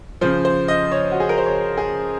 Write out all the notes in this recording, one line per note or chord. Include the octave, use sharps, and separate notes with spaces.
C#3 F3 C5
C5
D#5
C#5
F#4
G#4
A#4
C5
C#5
G#4